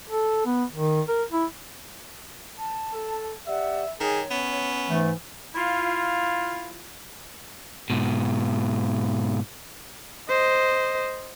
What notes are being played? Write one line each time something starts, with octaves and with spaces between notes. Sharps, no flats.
A4
B3
D#3
A#4
E4
A5
A4
G4 D5 E5 F#5
D#3 G#4 C#5
B3 C#4
G#2 E3 A3
E4 F4
G#2 B2
C5 D#5